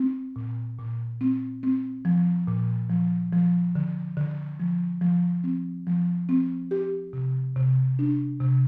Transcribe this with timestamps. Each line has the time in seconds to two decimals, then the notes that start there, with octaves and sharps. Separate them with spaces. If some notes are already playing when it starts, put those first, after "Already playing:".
Already playing: C4
0.36 A#2
0.79 A#2
1.21 C4
1.63 C4
2.05 F3
2.47 A#2
2.90 F3
3.32 F3
3.76 D3
4.17 D3
4.60 F3
5.01 F3
5.44 C4
5.87 F3
6.29 C4
6.71 G4
7.13 C3
7.56 C3
7.99 D4
8.40 C3